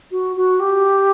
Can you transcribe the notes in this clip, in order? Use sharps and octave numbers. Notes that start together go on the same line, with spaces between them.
F#4
F#4
G4